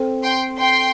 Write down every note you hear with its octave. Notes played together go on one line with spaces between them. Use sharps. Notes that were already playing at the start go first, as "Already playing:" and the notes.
Already playing: C4 A4 C5
G5 C6
G5 C6